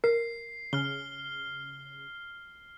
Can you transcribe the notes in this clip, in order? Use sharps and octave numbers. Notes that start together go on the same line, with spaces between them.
A#4 C7
C#3 F6 G7